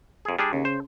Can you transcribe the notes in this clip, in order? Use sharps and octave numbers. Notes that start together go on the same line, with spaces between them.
F2 G#4
G3 D4 G#4
D#2 C#3
C5